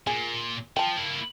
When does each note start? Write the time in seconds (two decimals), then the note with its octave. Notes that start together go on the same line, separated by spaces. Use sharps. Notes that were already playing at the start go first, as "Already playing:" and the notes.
0.07 A#2 G#4
0.77 F3 G5 A5
0.97 A#3 E4